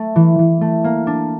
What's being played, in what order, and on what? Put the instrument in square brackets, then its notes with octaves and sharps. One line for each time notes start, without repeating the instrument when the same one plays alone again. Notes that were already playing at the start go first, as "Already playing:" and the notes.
Already playing: [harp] A3
E3
E3
A3
A#3
D4